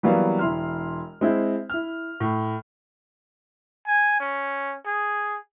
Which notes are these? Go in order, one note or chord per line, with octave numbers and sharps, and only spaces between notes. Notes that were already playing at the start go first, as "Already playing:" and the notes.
E3 F#3 G3 A#3 B3 F5
E1 E4 C6 F6
G#3 C4 E4
E4 F6
A2
G#5
C#4
G#4